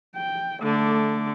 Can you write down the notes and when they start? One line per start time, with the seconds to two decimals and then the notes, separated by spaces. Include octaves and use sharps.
0.16 G5
0.63 D3 A3 D6